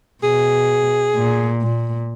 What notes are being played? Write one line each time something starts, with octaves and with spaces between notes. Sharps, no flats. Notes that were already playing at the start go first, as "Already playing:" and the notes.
B2 G#4
A#2
A#2